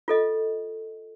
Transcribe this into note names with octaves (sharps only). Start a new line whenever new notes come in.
F4 A4 D#5